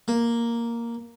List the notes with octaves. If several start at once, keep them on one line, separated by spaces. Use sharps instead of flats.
A#3